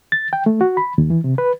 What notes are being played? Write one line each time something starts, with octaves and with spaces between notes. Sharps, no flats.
A6
G5
A3
F#4
B5
D#2
E3
C3
B4